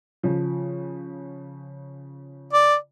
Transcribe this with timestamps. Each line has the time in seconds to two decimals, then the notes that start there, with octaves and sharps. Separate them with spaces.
0.23 C#3 F3
2.53 D5